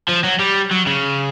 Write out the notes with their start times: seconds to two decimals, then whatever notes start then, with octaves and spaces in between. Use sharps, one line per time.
0.08 F3
0.24 F#3
0.39 G3
0.71 F#3
0.87 C#3